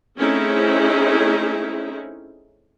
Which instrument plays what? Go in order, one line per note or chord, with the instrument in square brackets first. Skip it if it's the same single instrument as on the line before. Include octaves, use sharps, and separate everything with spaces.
[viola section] A3 C4 C#4 D#4 E4 G#4